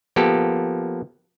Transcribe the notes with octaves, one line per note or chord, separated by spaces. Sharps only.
F3 A#3 B3 G4 A4